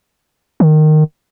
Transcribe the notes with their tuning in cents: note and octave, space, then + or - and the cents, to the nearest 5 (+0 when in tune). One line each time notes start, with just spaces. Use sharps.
D#3 -15